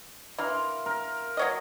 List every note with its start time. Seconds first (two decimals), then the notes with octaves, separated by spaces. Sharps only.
0.39 E3 A#4 F5 C6
0.86 A#4
1.37 F#3 C#5 D#5